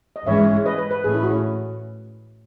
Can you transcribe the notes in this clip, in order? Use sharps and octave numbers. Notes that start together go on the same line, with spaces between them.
D#5
G#2 E3 G#3 C#4 C#5 E5
B4 D#5
B4
B4
A2 E3 A3 C#4 G#4
E4
F#4